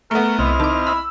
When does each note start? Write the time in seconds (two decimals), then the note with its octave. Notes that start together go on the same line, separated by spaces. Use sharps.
0.11 A3 B3 A#4
0.39 C2 C4 E4 D#5 F6
0.60 D#3 A5 D6
0.87 B5 E6